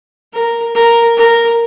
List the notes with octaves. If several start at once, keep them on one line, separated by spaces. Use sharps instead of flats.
A#4
A#4
A#4